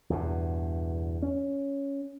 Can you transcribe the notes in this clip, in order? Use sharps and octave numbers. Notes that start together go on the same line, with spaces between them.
E2 G2 B2
C#4